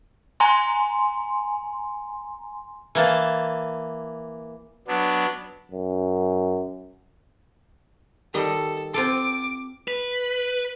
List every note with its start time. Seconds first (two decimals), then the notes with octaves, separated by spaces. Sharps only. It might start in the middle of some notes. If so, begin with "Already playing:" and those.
0.40 G#5 A#5 C6
2.95 E3 A#3 A5
4.87 F#3 B3 D4
5.71 F#2
8.34 D#3 G3 A4 D#5
8.94 C4 F4 A4 D6
9.88 B4